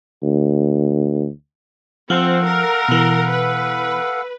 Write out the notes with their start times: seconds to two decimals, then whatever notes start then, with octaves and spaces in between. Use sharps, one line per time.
0.23 D2
2.10 F3 C4 A4 F5 F#5
2.45 A#4
2.88 B2 E3
3.29 B4